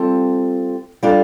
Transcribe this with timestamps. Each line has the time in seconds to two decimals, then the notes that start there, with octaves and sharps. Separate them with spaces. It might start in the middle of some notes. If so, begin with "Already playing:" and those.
Already playing: G3 C4 F4 A4
1.03 G3 D4 F4 A4